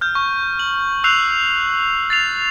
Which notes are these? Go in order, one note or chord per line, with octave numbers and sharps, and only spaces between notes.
F6 G6
C#6
F#7
E6 F#6 G6 C7 F7
A6 C7 F7